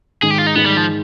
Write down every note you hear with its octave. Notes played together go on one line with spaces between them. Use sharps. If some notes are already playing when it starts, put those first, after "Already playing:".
G#2 D#3 G#3 G#4
G4
F4
D#4
G#2 D#3 G#3 B3
G3
F3